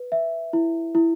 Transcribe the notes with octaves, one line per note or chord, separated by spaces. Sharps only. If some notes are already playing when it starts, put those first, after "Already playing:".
Already playing: B4
E5
E4
E4